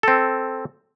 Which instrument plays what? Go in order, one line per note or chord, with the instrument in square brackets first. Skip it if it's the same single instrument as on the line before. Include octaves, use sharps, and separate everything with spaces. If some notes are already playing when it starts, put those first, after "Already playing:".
[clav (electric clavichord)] C4 A4